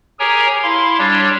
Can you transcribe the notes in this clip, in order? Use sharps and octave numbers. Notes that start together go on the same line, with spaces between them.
G4 G#4 A#4 C#5 G#5 A#5
E4 F5 C6
G3 D4 G4 C#5